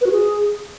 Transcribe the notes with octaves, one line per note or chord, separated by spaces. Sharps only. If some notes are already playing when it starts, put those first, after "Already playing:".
B4
F#4
G#4